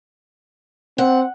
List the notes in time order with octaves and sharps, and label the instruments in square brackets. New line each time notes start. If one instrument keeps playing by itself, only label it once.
[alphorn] C4 [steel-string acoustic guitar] F#5